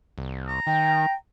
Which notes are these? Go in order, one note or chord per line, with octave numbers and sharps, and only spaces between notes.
C2
A#5
D#3 G5